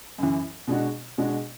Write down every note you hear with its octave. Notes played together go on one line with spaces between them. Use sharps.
F#2 C#3 E3
B2 G#3 D4 F#4
B2 G#3 D4 F#4